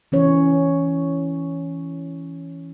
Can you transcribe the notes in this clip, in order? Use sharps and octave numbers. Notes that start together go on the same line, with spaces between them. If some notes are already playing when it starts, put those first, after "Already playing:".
E3 C#4 C#5